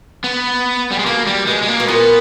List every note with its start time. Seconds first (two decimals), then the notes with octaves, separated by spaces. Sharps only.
0.24 B3
0.91 G3
0.99 G#3
1.06 B2 A#3
1.27 G3
1.47 B2 G#3
1.62 G#3
1.68 A#3
1.80 B2
1.88 A#2 B3